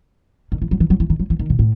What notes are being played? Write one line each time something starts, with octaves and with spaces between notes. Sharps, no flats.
D#3
E3
F#3
E3
F#3
E3
D#3
F#3
E3
D#3
B2
A2